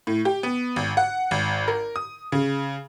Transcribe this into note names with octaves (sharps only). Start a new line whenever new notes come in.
A2
G4
B3
G#1
F#5
G#1
A#4
D#6
C#3